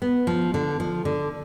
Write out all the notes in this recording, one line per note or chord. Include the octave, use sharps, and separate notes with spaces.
B3
F3
D3
F3
D3